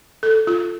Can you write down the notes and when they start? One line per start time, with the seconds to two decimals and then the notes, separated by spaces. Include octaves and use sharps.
0.23 A4
0.47 F4